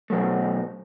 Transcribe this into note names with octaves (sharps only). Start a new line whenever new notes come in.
B2 F#3 A3